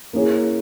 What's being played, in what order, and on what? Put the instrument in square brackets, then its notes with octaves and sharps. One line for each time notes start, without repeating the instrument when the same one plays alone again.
[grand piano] A#3 C#4 E4 G#4 C#5